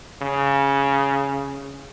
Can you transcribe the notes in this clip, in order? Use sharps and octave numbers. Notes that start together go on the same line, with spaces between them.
C#3